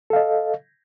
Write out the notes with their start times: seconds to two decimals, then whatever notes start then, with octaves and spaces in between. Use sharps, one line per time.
0.10 A4
0.13 F5
0.16 D#5